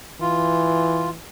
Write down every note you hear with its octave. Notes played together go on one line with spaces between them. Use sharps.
E3 F4